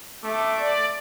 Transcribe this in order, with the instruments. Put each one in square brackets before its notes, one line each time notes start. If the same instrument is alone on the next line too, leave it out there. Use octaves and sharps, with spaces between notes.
[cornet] A3 [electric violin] E5 D6
[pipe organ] D5